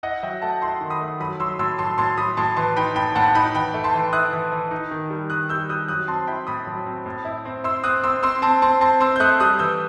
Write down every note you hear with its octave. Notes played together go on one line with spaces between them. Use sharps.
E4 D#5 F#5
F#3 E5 G5
A3 F#5 A5
E4 A5 C6
D#3
B5 D#6
A3
F#3 B5 D#6
F#3 C6 E6
A2 C6 E6
F#3 A5 C6
A2 A5 C6
F#3 B5 D#6
A2 A5 C6
E3 A5 C6
D#4 G5 B5
A2 G5 B5
A2 F#5 A5
D#4 G5 B5
E3 G5 B5
A3
A5 C6
E3
E4 D#6 F#6
E3
E3
D#4
D#3
G3
D#3 D#6 F#6
G3 E6 G6
G3 D#6 F#6
F#3 D#6 F#6
C4 A5 C6
E4 G5 B5
A2 B5 D#6
F#3
C4
A2
E4
C4
E4 C6 E6
C4 D#6 F#6
C4 C6 E6
C4 C6 E6
C4 A5 C6
C4 A5 C6
C4 A5 C6
C4 C6 E6
G6
A3 D#6 F#6
G3 D#6 F#6
E3 E6 G6